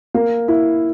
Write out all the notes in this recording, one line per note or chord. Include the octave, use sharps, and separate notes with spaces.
A#3
E4